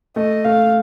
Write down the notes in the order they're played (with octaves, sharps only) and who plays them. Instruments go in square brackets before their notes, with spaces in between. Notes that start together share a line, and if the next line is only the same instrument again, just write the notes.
[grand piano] A3 [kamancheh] D#5
[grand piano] A3 [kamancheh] F5